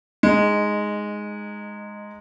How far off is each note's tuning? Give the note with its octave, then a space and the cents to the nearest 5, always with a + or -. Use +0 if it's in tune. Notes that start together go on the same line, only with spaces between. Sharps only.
G#3 +0 D#4 -15